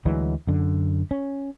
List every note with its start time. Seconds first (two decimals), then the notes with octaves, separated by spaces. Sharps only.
0.05 D2 E3 F#3 G#3
0.47 F#2 D3
1.11 C#4